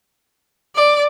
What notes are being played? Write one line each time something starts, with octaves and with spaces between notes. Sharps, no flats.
D5